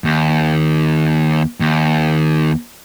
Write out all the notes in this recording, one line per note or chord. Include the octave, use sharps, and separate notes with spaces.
D#2
D#2